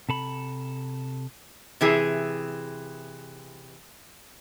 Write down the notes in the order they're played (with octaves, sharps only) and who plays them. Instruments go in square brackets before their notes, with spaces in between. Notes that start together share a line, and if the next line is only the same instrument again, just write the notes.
[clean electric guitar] C3 A4 B5
[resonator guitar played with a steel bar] C3 E3 G#4